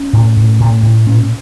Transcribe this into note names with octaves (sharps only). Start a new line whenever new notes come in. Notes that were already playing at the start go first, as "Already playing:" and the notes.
Already playing: C#4
A2
A2
A2
A2
A#2 C#4